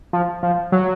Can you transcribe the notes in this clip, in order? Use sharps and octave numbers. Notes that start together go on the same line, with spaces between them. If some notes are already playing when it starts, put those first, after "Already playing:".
F3
F3
F#3